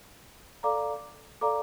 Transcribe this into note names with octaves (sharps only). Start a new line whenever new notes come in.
A4 D5 F5 A#5 D6
A4 D5 F5 A#5 D6